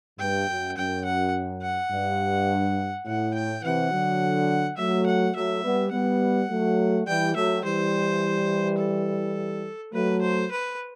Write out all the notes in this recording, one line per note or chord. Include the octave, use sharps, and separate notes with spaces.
G2 G5
F#2
F#2 G5
F#5
F#5
G2
A2 F#5
G5
C3 E3 F#5
D3 F#3
F#3 A3 E5
F#5
F#3 A3 E5
G3 B3
G3 B3 F#5
F#3 A3
E3 G3 G5
F#3 A3 E5
E3 G3 C5
A4
F#3 A3 B4
C5
B4